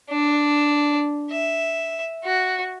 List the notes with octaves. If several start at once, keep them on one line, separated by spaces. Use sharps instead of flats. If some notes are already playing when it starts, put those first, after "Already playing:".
D4
E5
F#4